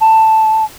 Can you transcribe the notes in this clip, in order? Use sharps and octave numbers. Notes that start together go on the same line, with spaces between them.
A5